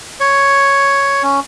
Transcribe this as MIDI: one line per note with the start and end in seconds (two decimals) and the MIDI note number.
0.20 1.23 73
1.23 1.40 61